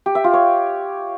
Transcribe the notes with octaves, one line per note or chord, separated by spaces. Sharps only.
G4
E5
F4
C#5